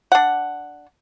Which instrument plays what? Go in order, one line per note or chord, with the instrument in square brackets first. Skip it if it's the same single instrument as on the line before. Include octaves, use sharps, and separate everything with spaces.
[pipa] D4 F#5